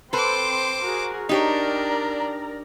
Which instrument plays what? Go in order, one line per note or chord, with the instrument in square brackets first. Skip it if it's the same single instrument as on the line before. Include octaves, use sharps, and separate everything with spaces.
[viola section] C4 C6 [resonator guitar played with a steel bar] A4 B4 [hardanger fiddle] C5 D6
[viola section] F#4 G#4 A#4
[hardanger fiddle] D4 [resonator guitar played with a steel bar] D#4 G4 C#5 [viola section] A#4 D5 A#5